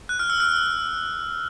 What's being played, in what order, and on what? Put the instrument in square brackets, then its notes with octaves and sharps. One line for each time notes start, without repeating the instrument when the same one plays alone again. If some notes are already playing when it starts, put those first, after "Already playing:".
[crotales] F#6
F6
E6
F6